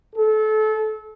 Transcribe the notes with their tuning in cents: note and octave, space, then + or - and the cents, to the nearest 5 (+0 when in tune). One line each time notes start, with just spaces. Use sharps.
A4 -30